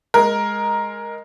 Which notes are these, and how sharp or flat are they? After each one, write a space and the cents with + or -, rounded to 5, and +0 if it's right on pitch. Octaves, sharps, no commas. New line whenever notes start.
G#3 +0 A#4 +5